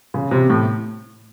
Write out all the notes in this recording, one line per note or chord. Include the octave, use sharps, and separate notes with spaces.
C#3
C3
A2